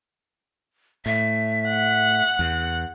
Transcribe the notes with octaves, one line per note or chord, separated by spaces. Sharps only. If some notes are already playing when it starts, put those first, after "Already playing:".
A2 E5
F#5
E2